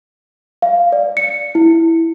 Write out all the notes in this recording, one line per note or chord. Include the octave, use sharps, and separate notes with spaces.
F5
D5
C#7
E4